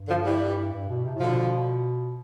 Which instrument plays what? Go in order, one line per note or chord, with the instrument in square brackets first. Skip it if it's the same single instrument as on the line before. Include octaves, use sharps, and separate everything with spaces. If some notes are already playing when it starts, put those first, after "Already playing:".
Already playing: [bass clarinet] G2
[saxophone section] D3 F3
E3 G3
[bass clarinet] G2
B2
C3
A2
[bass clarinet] B2 [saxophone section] D3 F3